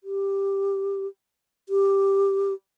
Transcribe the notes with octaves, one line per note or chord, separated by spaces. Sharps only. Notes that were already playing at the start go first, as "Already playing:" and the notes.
G4
G4